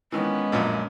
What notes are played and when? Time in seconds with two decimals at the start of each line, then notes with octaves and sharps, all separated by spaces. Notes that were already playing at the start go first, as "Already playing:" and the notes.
0.12 D#3 E3 G#3 B3 C#4
0.52 A#1 F#2 A#2